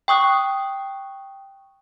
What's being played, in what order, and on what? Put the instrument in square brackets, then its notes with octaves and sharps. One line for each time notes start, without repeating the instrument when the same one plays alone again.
[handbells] G5 C#6 D#6 F#6